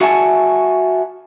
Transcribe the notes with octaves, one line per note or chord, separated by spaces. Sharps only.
F#4 E5 F#5 G#5 A5